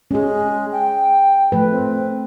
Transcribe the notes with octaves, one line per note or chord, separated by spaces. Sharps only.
G#3 C#4 G#4
G5
F3 A3 B4
C4